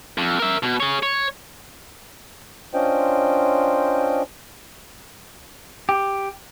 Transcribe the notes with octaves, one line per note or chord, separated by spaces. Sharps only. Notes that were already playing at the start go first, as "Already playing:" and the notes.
F2
A#4 E5
B2
G#4 C#5
C#5
C#4 D4 F4 C5 D#5 G5
G4